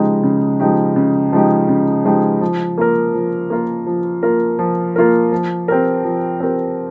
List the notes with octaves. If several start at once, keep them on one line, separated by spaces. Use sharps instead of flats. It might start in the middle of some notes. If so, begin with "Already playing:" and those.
Already playing: C#3 F3 G#3 D#4 G4
C#3
F3 G#3 D#4 G4
C#3
F3 G#3 D#4 G4
C#3
F3 G#3 D#4 G4
F3
A#3 F4 A#4
F3
A#3 F4 A#4
F3
A#3 F4 A#4
F3
A#3 F4 A#4
F3
C4 G4 A#4
F3
C4 G4 A#4